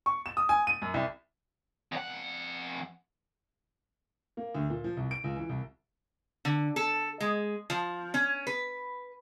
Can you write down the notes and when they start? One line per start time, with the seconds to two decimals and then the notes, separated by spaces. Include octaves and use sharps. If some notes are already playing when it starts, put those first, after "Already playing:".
0.06 C#6
0.26 E7
0.37 D#6
0.49 G#5
0.67 D#7
0.82 F#2
0.94 C2
1.92 F2 F#5
4.37 A#3
4.55 D2
4.70 A#2
4.84 F3
4.97 C2
5.11 D7
5.24 C#2
5.36 E3
5.49 C2
6.45 D3
6.76 A4
7.21 G#3
7.70 F3
8.14 C#4
8.47 B4